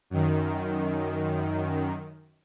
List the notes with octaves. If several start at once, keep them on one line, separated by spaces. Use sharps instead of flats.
F#2 D#3